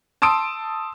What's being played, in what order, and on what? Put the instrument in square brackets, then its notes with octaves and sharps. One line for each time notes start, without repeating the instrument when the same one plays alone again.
[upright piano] A5 C6 D#6 E6 D7